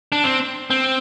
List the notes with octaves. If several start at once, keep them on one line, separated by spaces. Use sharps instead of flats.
D4
C4
C4